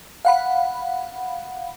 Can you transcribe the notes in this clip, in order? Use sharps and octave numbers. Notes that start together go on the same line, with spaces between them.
F5 F#5 B5